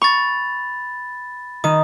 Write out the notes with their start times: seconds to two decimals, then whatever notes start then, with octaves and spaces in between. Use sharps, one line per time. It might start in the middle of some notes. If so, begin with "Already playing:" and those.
0.02 B5 C#6 A6
1.64 D#3 D#6